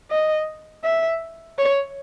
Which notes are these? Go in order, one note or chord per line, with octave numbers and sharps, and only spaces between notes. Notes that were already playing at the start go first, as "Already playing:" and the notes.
D#5
E5
C#5